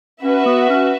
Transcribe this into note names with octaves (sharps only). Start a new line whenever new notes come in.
C#4 F#4 B4 E5
B3
C#4